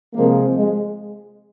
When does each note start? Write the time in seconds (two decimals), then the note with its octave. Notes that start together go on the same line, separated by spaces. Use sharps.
0.14 C3 F3 G#3 A#3
0.55 G#3